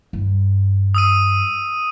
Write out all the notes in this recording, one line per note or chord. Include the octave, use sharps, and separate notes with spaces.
G2
D#6 E6 D#7